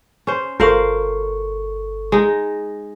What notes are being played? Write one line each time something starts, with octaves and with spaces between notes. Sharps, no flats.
C#4 C5
G1 A4 A#4 C5 F5 C#6
G#3 D#4